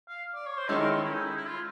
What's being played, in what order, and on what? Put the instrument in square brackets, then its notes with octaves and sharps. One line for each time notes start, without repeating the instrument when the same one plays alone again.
[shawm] F5
D5
C#5
C5
[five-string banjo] D#3 G#3 C#4 E4 [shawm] A4
[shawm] A#4
A4
E4
D#4
E4
E4
F4